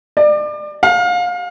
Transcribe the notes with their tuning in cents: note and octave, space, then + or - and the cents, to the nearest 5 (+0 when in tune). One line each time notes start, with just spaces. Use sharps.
D5 +30
F5 +30